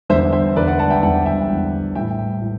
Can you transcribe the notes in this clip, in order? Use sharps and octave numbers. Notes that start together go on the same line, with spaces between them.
E2 D3 G3 C5 E5
C5 E5
E2 D3 G3 B4 D5
D5 F#5
F#5 A5
E5 G5
E2 D3 G3 F#5 A5
E5 G5
E2 D3 G3
A2 G3 E5 G5
A2